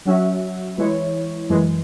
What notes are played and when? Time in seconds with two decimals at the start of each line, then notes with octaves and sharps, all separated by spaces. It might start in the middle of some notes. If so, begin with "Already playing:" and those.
0.06 F#3 C#4 F#4 E5
0.78 E3 G#3 E4 C#5
1.49 F#2 E3 G#3